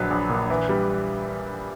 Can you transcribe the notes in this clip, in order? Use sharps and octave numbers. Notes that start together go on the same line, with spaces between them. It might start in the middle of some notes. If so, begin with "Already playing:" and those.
Already playing: A#1 D3 F#3 B4
A#1
A#2
E3
G3